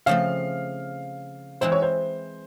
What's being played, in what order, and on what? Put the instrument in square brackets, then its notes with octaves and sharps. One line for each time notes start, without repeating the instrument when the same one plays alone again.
[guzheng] C#3 F3 A3 C4 [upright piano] F5
[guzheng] E3 G#3 C4 E4 [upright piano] C5
[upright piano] C#5
C5